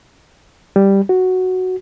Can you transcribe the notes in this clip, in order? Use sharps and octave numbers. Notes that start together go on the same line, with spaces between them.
G3
F#4